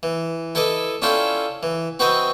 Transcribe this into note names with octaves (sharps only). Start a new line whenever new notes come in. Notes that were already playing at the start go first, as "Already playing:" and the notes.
E3
E4 A4 B4 D#5 D6
C#4 D4 E4 F4 A4 G5
E3
C4 F#4 B4 D#5 E5 G5